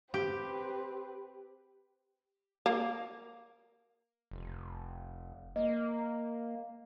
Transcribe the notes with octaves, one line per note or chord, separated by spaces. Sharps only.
C4 G4 B4
A#3
F1
A#3 D#5